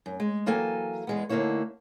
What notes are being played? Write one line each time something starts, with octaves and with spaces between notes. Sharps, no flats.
F#2
G#3
E3 F#3 A#3 A4 G5 G#5
E2 G#3 B3
D2 D3 A#3 D#4 E4 C#5